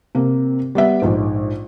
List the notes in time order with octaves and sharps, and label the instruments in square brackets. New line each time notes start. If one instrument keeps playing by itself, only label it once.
[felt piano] C3 A#3
G3 B3 E5
A#1 G#2